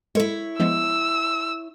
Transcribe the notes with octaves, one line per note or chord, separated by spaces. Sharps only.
G#3 E4 A4 C#5
F3 G#3 B3 E6